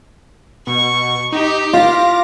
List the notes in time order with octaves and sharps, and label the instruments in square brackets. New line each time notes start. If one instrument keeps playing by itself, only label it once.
[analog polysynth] B2 [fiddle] C#6
[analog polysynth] D#4 [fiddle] G4
[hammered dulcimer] F4 [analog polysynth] F5 D6 A#6